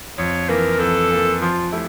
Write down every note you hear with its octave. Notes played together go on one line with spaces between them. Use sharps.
F2 C#5
E3 A#3 A#4
F2 A4
E3 A#3
F3 F4
A3 E4 G4